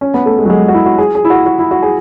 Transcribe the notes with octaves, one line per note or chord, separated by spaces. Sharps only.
C#4
B3
A3
G#3
F#3
G#3
F#4
E4
F#4
G#4
G#4
E4
F#4
F#4
E4
F#4
G#4